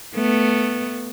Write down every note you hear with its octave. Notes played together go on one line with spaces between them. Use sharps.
A3 B3